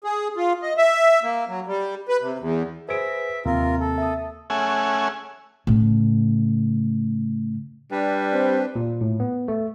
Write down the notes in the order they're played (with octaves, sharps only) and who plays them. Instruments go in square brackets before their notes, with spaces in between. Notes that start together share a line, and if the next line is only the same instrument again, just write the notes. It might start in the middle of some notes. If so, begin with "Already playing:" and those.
[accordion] G#4
F4
D#5
E5
A#3
F#3
G3
B4
C3
E2
[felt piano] G#4 C5 D7 [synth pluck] B4 A#6 [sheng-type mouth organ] E5
[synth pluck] D#2 [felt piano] C3 A#3 [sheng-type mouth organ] F4 A#4
[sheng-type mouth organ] A4
[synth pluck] E5 A5 D#6
[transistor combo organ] A3 C#4 G#4 E5 F#5 G#5
[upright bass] A2 C#3
[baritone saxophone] G3 [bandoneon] D4 B4
[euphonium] C4
[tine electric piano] A#2
A2
B3
A3